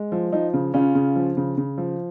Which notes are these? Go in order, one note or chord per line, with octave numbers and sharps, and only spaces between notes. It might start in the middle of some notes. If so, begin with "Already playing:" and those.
Already playing: G#3
F3
F3 D#4
C#3
C#3 C#4 F4
C#3
F3
C#3
C#3
F3